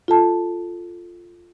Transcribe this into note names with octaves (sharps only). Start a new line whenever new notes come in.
F4 A4 A5